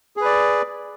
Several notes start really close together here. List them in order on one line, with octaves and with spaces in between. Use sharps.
G#4 B4 D5